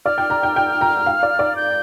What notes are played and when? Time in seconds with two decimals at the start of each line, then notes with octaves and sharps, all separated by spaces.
0.05 D5 F6
0.18 G5
0.30 A#5
0.43 G5
0.56 G5
0.81 A#5
1.06 F5
1.23 D5
1.39 D5
1.56 G6